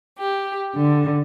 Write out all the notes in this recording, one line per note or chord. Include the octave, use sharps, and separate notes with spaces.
G4
D3